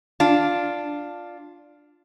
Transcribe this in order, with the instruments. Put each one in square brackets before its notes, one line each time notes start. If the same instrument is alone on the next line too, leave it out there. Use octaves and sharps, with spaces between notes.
[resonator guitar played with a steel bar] D4 F4